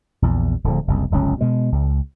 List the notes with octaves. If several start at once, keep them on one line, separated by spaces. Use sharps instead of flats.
A#1 E2
D1 D3 F3
F#1 C2
D1 G1 C#2 C#4
B2 G#3
C#2